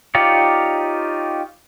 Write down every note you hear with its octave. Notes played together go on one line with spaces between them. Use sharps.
D#4 F4 G4 C#5 D5